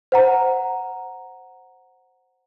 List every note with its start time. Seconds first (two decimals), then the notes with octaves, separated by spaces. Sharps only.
0.12 C5 F#5 A#5